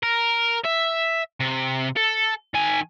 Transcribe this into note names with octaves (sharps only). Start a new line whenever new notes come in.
A#4
E5
C3
A4
D#3 G#5